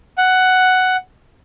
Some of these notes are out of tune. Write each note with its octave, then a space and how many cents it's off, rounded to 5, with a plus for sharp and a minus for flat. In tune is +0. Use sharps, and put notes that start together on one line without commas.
F#5 +5